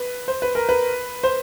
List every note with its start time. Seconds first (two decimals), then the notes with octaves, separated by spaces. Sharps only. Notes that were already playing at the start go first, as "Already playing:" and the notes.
Already playing: B4
0.28 C5
0.42 B4
0.55 A#4
0.69 B4
1.23 C5